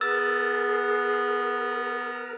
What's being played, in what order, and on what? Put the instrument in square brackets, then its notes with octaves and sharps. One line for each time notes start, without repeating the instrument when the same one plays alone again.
[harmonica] B3 [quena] G#4 [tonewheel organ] A#4 [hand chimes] E6 A6